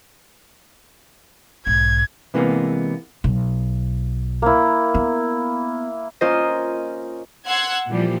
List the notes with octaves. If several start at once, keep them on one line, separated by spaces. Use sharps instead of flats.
B1 G#2 G#6
C3 E3 G#3 A#3 B3
B1
A#3 E4
B3
A#3 C#4 F4 C5 D#5
F#5 C6 E6 F#6 G#6
A#2 E3 F3 G3